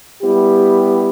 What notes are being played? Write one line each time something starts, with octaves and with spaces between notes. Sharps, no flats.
G3 B3 E4 G4